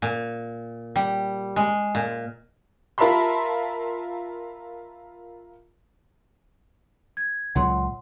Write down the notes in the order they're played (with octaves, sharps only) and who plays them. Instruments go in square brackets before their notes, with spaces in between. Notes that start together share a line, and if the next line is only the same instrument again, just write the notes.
[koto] A#2
G3
G#3
A#2
[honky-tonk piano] F4 A#4 E5 A5 B5 C6
[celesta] G#6
[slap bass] C#2 A#2 F#3 [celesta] F#5 C6